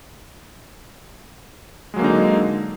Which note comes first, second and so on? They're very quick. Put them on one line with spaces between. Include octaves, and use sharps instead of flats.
G#3 F#3 A#3 D3 D#4